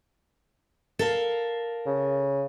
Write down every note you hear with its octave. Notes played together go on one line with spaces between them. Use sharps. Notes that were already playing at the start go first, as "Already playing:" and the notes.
A4 A#4 F5
C#3